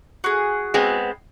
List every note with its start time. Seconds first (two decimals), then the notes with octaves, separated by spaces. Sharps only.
0.24 F#4 G#4
0.74 G#3 B3 C4